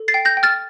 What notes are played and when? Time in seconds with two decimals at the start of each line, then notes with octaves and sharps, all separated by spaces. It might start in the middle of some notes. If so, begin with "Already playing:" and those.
Already playing: A4
0.08 A6 C7
0.14 G5
0.25 G6 A#6
0.37 G5
0.43 F6 A6